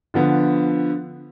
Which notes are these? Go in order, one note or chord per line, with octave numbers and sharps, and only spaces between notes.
D3 F3 B3